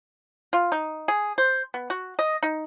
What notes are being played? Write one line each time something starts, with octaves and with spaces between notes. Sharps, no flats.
F4
D#4
G#4
C5
B3
F#4
D#5
D#4